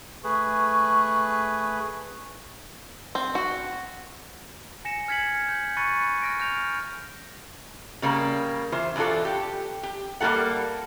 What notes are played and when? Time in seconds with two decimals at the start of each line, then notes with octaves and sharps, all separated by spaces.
0.24 A3 G#4 B4 C#6
3.15 C4
3.35 F#4
4.85 G#5 A#6 C#7 E7
5.08 F6 G#6 B6 C#7 F#7
5.48 G6
5.77 B5 C#6 F#6 A6 C#7 D#7
6.22 F6 A#6 D7
6.40 F6 G6 A#6 F7
8.02 C#3 G3 A#3
8.72 E3 F4 C5
8.96 E2 B2 D4 F4 A4
9.25 G4
9.83 G4
10.21 G3 A#3 C#4 F#4 A4 F#5